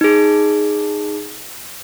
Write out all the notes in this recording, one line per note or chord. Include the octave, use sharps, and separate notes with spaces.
D#4 G#4